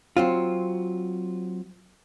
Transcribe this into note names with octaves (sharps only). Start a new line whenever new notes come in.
F#3 C4 F4